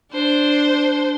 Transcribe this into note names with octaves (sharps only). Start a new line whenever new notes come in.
D4 C5